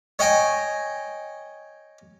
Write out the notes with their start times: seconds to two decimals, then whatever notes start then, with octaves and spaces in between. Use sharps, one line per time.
0.19 C#5 D#5 G5 G#5